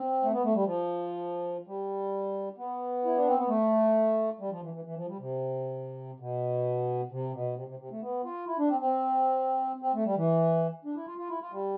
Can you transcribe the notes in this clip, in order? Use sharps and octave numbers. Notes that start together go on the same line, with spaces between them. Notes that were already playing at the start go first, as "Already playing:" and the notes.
Already playing: C4
A3
B3
A3
G3
F3
G3
B3
E4
D4
C4
B3
A3
G3
F3
E3
E3
E3
F3
G3
C3
B2
C3
B2
C3
C3
C3
A3
B3
F4
E4
D4
C4
C4
C4
A3
G3
E3
D4
E4
F4
F4
E4
F4
G3